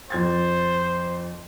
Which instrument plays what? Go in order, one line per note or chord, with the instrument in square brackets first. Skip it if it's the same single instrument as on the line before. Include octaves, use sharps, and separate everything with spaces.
[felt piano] F2 G#6 A6 [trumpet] C5